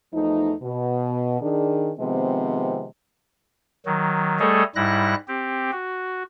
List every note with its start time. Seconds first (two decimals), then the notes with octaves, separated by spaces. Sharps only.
0.13 E2 F3 A3 D#4
0.62 B2
1.41 D#3 D4 G#4
1.99 C3 D#3 F3 G#3 B3 C4
3.86 D#3 F#3
4.40 G3 A3 G#4 A4 C#5 D#5
4.76 G#2 G3 E4 F#6 A#6
5.28 C4 G4
5.72 F#4